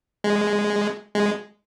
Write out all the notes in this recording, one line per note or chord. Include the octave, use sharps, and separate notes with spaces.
G#3
G#3